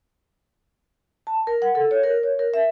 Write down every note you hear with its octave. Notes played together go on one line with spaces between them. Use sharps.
A5
A#4
F#5
A4
C#5
A#4
C#5
A#4
E5